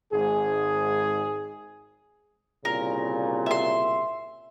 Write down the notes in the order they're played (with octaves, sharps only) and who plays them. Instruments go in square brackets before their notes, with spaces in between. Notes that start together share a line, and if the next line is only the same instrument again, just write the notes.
[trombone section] G#1 G#2 G#4
[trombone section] C2 A#2 C#3 [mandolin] A#4
[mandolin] E5 C6